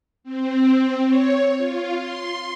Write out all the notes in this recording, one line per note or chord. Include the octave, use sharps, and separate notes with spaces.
C4
C#5
F4
C6